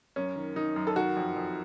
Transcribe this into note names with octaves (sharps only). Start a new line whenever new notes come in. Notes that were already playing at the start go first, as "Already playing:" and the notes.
F#2 C#4
D#3
D#3 D#4
F#2
A4
D#3 F#4
F2
F2